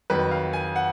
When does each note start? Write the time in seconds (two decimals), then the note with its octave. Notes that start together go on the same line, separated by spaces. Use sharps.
0.10 F2 D#3 F#3 B4
0.31 F5
0.53 G#5
0.76 F#5